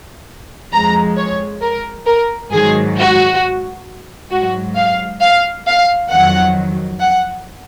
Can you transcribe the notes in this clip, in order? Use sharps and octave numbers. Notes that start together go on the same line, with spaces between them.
F2 F3 G#3 A#5
C#5
A#4
A#4
G#2 D#3 F#3 G#4
F#4
G#2 F#3 F#4
F5
F5
F5
F2 D#3 F#3 F#5
F#5